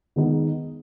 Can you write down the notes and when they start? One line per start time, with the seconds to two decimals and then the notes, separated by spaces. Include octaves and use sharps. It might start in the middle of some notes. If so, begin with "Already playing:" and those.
0.16 D#3 G#3 B3 D#4